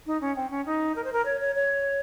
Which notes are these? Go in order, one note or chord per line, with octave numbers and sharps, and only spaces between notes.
D#4
C#4
C4
C#4
D#4
A#4
C5
A#4
C#5
C#5
C#5